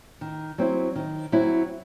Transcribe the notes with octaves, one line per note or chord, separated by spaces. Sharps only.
D#3
F#3 C4 E4
D#3
F#3 C4 E4